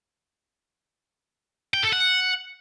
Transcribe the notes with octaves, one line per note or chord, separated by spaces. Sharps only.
G5
A4
F#5